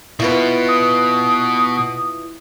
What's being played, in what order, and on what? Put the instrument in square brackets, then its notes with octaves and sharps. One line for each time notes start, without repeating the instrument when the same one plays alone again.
[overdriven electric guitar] B2 B3 [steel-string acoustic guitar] E4 F4 B4
[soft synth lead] D#6